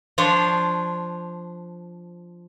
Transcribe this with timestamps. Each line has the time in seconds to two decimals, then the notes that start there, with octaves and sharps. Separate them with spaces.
0.18 F3 D4 C5 C#5